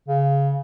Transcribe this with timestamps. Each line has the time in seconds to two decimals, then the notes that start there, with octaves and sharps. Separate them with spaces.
0.08 C#3